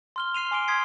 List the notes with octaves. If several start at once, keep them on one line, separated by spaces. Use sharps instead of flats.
C6 F6 G7
F6 C7 D#7 F7
G#5 C6 D6 C7 D7 G7
C6 D#6 G#6 B6 C7 D7